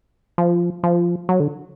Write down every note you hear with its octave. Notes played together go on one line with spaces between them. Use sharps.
F3
F3
F#3
D3